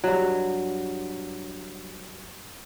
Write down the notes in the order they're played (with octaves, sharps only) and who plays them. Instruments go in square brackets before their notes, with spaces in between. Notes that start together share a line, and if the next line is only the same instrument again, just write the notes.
[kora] G2 F#3